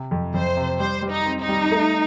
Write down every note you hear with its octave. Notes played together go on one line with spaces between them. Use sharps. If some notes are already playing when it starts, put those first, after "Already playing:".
Already playing: C3
F2
F2 C5
C3
G3 C5
G3
D#4
C4
D#4
G3
A3